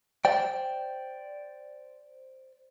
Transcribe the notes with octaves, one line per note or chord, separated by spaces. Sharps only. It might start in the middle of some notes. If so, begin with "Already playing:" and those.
C5 D5 G5